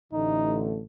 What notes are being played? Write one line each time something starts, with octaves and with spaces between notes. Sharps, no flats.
A1 D3 A3 D#4